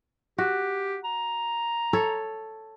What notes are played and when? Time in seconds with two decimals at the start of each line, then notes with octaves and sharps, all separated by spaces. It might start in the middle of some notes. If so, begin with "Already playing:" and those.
0.38 F#4 G4
1.04 A#5
1.93 A4 C#5